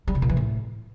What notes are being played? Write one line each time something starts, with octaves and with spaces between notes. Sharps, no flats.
G3
C3
A#2
E3
A2